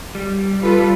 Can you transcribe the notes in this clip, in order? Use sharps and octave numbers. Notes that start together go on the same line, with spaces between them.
G3
F4 A4 B4